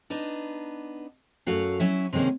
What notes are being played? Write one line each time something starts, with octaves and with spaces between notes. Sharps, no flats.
B3 D4 D#4
F#2 A3 C#4 F#4 F5
F#3 C#4 E4 E5
C3 D#3 G#3 A#3 C#4